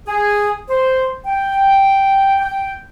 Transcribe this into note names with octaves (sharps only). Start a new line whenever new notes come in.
G#4
C5
G5
G5